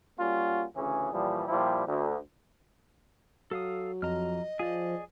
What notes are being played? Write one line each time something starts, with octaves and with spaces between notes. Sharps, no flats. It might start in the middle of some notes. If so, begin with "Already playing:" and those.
G3 A#3 C#4 F4 F#4
D2 C#3 E3 C#4 G#4
A#2 E3 F3 G3
A#2 F3 G3 E4 G4
D2
F#3 A4 F5 D#6
F2 D#5 A#5 F6
F3 G#4 D5